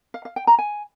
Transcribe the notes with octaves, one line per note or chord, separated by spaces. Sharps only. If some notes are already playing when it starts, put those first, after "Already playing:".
F5
F5
G5
A#5
G#5